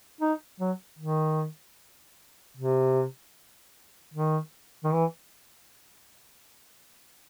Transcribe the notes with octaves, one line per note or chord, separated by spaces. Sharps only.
D#4
F#3
D#3
C3
D#3
D#3
E3